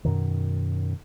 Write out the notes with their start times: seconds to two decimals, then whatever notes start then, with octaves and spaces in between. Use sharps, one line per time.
0.05 F#2 B2 D#3